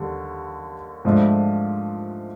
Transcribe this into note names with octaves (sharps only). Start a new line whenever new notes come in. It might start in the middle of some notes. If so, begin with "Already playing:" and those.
Already playing: D#2 D3 G3
G#2 F3 A3 D4